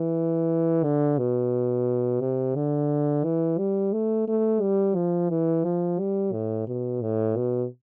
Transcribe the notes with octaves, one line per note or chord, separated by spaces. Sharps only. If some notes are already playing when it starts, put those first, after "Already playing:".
Already playing: E3
D3
B2
C3
D3
E3
G3
A3
A3
G3
F3
E3
F3
G3
A2
B2
A2
B2